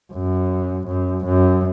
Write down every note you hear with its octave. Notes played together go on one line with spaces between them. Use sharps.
F#2
F#2
F#2